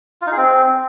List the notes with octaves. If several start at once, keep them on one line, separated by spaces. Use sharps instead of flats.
F4
D#4
G#4
C4